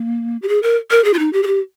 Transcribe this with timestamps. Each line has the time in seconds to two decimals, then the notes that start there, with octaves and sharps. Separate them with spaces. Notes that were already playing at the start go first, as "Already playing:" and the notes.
Already playing: A#3
0.42 G4
0.48 G#4
0.63 A#4
0.91 A#4
1.04 G#4
1.14 F4
1.19 D#4
1.33 G4
1.43 G#4
1.47 G4